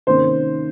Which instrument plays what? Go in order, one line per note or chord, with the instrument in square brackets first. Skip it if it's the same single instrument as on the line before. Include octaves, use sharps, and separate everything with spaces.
[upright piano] C3 D#3 A#3 C#4 C5